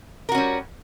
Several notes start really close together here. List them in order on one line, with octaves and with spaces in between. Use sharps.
A#4 F#4 C#4 G3